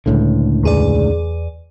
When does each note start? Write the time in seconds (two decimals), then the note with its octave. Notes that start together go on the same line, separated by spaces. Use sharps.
0.06 C#2 A2 D3
0.63 E2 G#4 D5